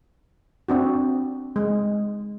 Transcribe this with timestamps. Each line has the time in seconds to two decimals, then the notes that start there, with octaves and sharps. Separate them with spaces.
0.69 C4 D4 F#4
1.56 G#3